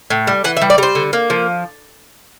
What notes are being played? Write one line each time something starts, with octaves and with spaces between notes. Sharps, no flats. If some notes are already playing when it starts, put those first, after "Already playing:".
A2
G3
E3 F#5
E5
G3
D5
G3 C5
D3
A#3
F3